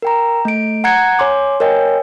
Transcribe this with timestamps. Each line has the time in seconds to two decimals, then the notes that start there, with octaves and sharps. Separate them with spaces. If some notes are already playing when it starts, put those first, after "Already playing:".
0.02 A#4 G5 A#5
0.45 A3 D7
0.84 F#5 A#5 F#6 G#6 C#7
1.19 C#5 G#5 C6 D6
1.60 A#4 C#5 D#5 G5 G#5